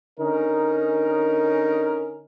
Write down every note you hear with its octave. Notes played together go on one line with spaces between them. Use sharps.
D3 C#4 D#4 A#4